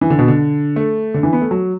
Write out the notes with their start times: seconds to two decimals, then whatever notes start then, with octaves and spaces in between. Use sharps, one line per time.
0.01 E3
0.10 D3
0.19 B2
0.28 D3
0.76 A3
1.14 D3
1.23 E3
1.33 B3
1.41 A3
1.51 F#3